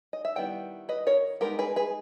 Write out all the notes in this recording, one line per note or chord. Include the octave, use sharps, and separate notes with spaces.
D#5
E5
D#3 G3 B3 E4 G5
B4 D#5
A#4 C#5
G#3 B3 D#4 G4 A#4
G#4 B4
G#4 B4